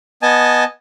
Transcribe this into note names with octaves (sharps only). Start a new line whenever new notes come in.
B3 D#5 G#5 A5